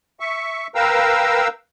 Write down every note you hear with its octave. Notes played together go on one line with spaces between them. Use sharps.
E5 C#6
A#4 B4 F5 G5 A#5 E6